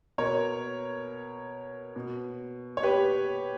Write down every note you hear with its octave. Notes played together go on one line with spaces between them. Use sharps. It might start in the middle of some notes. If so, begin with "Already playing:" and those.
B2 A#4 C#5
B2
C#5
G4 B4